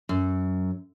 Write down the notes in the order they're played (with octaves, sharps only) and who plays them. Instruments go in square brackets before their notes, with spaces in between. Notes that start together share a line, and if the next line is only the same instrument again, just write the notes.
[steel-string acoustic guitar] F#2